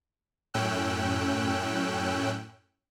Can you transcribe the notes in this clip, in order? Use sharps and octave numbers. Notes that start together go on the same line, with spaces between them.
F#2 A2 C#4 G5 E6 F#6